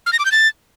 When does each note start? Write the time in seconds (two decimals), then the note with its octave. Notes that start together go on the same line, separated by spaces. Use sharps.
0.06 F6
0.13 A#6
0.19 D6
0.25 G6
0.32 A6